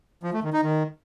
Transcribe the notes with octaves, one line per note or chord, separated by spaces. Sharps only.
F3
A3
D#3
D#4
D#3